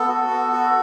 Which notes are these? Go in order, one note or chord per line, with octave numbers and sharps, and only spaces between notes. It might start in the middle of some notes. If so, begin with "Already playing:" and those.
Already playing: B3 A4
F#4
B3
F#4